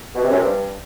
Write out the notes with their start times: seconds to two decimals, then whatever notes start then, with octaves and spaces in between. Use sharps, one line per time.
0.15 B2
0.22 C3
0.30 F#2
0.37 C3
0.44 G2